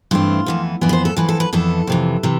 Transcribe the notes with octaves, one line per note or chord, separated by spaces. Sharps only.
G2 E3 A3 C4 F4
F2 E3 B3
F2 E3 B3 D5
B4
C5
A4
F2 E3 B3 B4
A4
B4
F2 E3 B3 A4
F2 C3 E3
C3 E3